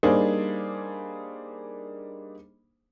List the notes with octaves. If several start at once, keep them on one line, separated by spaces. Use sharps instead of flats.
G3 A#3 D4 D#4 G#4 C5